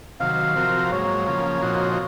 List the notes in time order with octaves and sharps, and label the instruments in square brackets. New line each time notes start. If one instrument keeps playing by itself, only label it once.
[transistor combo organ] C3 D#3 F#3 [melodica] F5
[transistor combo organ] C3 F3 C4 F#4 A#4
[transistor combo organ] G#2 F#3 A#3 [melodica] C#5
[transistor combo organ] C#3 F3 A#3
A#2 F3 C4 D#4 F#4